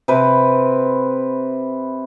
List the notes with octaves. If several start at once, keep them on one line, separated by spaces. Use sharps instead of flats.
C3 B4